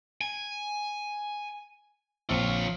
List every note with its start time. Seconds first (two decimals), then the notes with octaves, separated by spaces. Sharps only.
0.21 G#5
2.29 A#1 C4 F4 C#5 E5